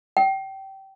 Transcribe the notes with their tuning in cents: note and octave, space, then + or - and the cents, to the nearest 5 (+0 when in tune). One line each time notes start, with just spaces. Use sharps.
G5 -25